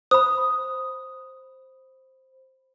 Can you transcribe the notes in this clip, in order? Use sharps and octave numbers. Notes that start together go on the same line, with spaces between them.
C5 B5 D#6